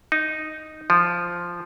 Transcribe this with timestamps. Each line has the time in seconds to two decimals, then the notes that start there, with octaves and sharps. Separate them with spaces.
0.12 D#4
0.90 F3